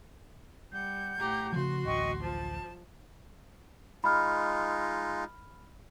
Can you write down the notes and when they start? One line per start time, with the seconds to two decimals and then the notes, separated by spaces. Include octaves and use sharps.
0.72 G3 F#5 G6
1.19 A2 G4 A#5
1.53 C#3 F3 F#4 C6
1.85 D1 A1 D2 D#5 G5 C#6
2.21 F3 A5
4.04 G#3 D#4 F4 B5 F6